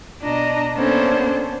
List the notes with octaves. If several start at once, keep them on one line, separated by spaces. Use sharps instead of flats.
B2 D4 D#5 A#5
A#3 B3 C#4 D4 A4 C5